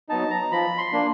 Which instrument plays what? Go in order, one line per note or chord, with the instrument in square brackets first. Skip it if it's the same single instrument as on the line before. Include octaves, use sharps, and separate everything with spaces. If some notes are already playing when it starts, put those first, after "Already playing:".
[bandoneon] F#3 B3 D#4 A5
A#5
F3 B5
C6
A#3 D4